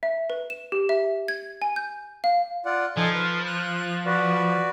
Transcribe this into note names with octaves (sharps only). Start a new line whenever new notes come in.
E5
B4
E7
G4
E5
G#6
G#5
G6
F5
F4 D5 F#5
F3 D#4 A4 G#5
B4
F#6
F#4 B4 D5